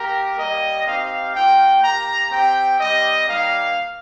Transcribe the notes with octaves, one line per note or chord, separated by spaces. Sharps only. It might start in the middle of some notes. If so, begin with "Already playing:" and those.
Already playing: A#3 G4 A#4
G3 A#3 G4 D#5
C4 D#4 G4 F5
A#3 F4 G5
A#3 G4 A#5
C4 G4 G5
G3 C4 G4 D#5
G3 A#3 D#4 F5